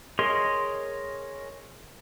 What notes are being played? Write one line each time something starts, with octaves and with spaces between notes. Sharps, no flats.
G#4 A#4 C#5 D#5 C6